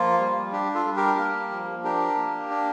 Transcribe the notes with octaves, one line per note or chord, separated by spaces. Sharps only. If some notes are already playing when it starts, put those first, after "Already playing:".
Already playing: F3 A#3 F4
G3
D4 G4
F4 A4
G3
G4 A#4
A#3
F3
D4 G4 A#4
A#3
D4